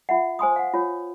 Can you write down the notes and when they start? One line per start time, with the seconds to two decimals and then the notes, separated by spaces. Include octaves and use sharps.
0.09 F4 E5 F#5
0.39 C5 G#5 C6 D#6
0.56 F5 F#5
0.73 F4 C#5